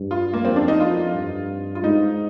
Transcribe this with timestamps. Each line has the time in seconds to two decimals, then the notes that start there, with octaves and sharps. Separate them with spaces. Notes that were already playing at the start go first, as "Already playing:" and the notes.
Already playing: G2
0.11 F4
0.33 A#3
0.45 F2 C4
0.56 D4
0.68 D#4
0.80 F4
1.15 G2
1.75 F4
1.84 G#2 D#4